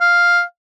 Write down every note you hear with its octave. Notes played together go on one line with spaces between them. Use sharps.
F5